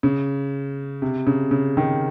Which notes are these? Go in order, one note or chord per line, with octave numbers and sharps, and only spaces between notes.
C#3
C3
C#3
C#3
D#3